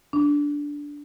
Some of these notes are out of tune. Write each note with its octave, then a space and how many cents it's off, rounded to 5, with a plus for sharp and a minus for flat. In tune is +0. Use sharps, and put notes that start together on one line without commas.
D4 -10